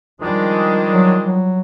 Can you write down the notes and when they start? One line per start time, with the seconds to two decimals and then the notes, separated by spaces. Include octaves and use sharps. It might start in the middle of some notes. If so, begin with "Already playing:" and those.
0.21 D#3 F3 G3 G#3 D4
0.91 F#3
1.25 F#3